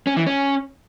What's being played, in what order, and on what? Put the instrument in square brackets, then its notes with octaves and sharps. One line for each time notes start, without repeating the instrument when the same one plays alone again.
[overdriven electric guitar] C#4
E3
C#4